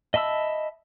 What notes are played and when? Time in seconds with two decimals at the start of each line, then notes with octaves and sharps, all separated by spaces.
0.14 D#5 E5 A5 B5 E6